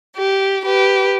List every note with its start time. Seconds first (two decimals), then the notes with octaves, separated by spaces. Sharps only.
0.17 G4
0.64 G4 B4